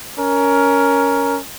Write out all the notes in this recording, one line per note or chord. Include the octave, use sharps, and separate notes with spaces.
C#4 A#4